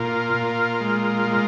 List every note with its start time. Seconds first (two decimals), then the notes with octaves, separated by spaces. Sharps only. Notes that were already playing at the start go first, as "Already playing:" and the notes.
Already playing: A#2 F4 A#4
0.34 A#2
0.81 G#3
1.27 G#3